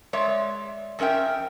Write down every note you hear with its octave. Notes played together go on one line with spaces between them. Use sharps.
G#3 C#5 D5 E5
F2 C#4 A#4 E5 G5